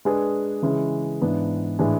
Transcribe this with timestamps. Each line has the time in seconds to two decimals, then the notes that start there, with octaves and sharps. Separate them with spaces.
0.05 G#3 D4 G#4 B4
0.63 C#3 E3 G#3 C#4 E4
1.22 G#2 E3 B3 D4
1.79 A2 E3 G#3 D4 G#4